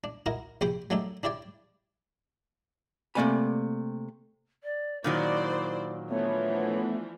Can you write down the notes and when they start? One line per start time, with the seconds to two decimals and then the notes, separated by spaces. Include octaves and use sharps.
0.04 D4
0.26 D#4 E4 F#4 A#4
0.61 A#1 C3 C5 G5 B5 C#6
0.90 F#3 A3 D4 D#4 G4 A4
1.23 D4 E4 G4 C#5 D5
3.15 C3 A3 A#3 D5 G#5 B5
4.63 D5
5.04 A#2 D#3 F#3 E4 C5 D5
6.09 E3 F3 A3 B3 D4 C#5